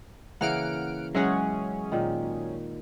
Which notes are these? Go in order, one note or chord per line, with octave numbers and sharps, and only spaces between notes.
C#3 E3 A#3 F#5 F6 D7
F#3 G#3 C#4 G#4 E5 F#5
A#2 D#3